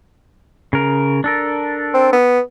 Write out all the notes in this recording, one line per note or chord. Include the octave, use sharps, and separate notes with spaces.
C#3 A#4
D4 A4 A#4
C4
B3